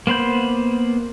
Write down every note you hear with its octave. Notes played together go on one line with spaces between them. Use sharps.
A#3 B3 C5 B5 G6